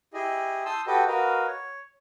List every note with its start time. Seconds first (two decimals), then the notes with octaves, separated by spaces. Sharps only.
0.14 E4 G4 G#4 D#5
0.65 A5 C6 D#6 E6 G6
0.87 F#4 G4 A4 B4 D#5 G5
1.08 F#4 A#4 B4 D#5 F5
1.47 C#5